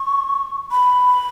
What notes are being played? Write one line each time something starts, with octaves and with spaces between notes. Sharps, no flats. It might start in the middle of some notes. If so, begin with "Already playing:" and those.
Already playing: C#6
B5